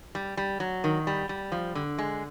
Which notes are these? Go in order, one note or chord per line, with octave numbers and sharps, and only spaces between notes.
G3
G3
F#3
D#3
G3
G3
F3
D3
G#3